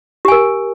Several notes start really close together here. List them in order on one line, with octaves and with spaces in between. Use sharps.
G4 G#5 A#4